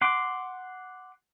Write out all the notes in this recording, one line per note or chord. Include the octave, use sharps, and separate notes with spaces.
F#5 C6 D6